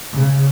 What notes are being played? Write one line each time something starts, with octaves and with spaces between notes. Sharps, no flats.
C#3